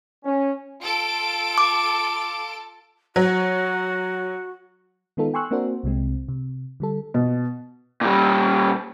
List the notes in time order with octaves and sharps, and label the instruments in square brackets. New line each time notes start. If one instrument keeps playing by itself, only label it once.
[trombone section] C#4
[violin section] F4 A4 D7
[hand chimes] D6
[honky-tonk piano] F#3 [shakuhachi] F#4
[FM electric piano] D#3 G#3 B3 D#4 F4 A4
G5 G#5 C6 C#6 E6 F#6
A#3 C4 D4 F#4 A#4 C5
C2 C3 G#3 C4
C3
D3 G3 A4
[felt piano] B2
[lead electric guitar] A#2 G3